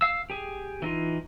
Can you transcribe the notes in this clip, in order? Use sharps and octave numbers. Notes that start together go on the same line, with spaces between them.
F5 E6
G4 G#4
E3 D#4 F4